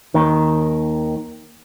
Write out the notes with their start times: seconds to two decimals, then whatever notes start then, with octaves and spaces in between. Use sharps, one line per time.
0.14 D#2 D#3